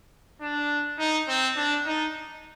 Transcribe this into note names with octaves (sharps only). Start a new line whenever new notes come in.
D4
D#4
C4
D4
D#4